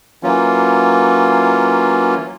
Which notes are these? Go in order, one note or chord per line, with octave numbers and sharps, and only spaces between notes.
E3 F#3 A#3 C#4 F4